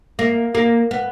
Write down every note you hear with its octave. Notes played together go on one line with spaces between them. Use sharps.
A#3
A#3
B3